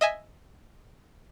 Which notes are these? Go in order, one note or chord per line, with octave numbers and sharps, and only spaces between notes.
D#5 E5 G#5